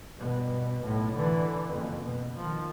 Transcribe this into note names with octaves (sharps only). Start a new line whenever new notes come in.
G2 B2
B1 A2
D3 E3
F#1 F2
B2
D#3 F3